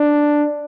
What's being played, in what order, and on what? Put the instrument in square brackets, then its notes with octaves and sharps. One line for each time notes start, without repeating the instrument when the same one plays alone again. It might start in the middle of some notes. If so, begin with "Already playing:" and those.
Already playing: [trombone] D4